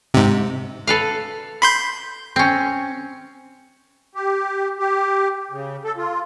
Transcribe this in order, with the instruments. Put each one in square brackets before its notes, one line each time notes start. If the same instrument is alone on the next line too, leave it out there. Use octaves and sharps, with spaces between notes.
[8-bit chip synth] G#2 C3
[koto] A4 B4 F5
[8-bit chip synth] B5 C6 G6
[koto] C4 C#4
[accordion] G4
G4
C#3
A4
F4